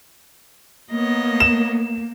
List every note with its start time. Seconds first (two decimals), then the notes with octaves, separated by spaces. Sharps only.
0.92 A#3 B3 C#5 D#5
1.40 E7